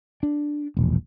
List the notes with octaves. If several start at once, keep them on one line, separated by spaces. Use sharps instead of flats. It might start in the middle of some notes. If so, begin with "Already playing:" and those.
D4
E1 A#1